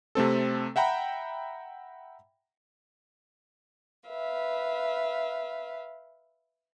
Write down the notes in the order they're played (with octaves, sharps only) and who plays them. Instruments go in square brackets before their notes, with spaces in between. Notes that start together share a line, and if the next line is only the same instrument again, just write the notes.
[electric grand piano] C3 A3 C4 A4
E5 F#5 G5 A#5 B5
[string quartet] B4 E5 F5